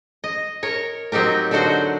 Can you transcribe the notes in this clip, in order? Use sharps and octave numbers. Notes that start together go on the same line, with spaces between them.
D#5
A#4 C#5
F#3 C4 D#4 G4 A#4
D3 D4 D#4 F#4 C5